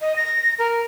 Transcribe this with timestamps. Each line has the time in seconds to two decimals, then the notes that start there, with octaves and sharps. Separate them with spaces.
0.01 D#5
0.16 A#6
0.59 A#4